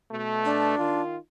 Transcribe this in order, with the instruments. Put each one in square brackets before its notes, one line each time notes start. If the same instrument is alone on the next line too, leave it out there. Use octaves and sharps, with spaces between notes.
[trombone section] B2 A3
[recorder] D4
[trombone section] D#3 F4